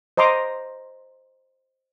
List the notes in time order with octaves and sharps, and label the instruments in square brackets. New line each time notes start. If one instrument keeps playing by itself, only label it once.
[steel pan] C5 D#5 A#5 C6 D6